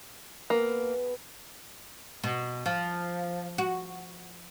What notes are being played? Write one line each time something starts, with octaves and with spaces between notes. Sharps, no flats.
A#3 B3 G#4 B4
B2
F3
F#4